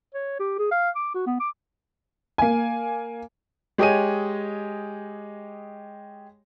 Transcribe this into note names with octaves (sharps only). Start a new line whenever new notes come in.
C#5
G4
G#4
F5
D6
F#4
B3
D6
A#3 G#5
G#3 G4 C#5 D#5 G#5 D#7